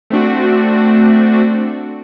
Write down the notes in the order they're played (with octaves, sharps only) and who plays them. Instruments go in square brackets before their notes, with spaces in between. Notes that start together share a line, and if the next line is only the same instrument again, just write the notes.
[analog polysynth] A3 C4 D4 F#4